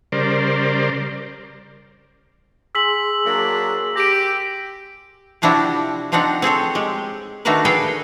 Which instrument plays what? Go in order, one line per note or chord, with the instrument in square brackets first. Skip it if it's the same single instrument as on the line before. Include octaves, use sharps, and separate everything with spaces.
[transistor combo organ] C#3 G3 A#4 C5 D5
[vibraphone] G#4 G#5 C6 [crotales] E6 B6 F#7
[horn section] F#3 A#3 D4
[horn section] G4 [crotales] A#6 D7
[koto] C3 F3 D4 E4 F#4 G4
F3 C4 D4 D#4 F#5 A#5
C4 G#4 A4 C#5
G#3 G4
D#3 A3 D4 F#4 A#4 B4
G#4 A4 B4 F5 G5